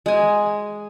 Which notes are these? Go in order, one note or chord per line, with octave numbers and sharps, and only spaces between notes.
G#3 G#5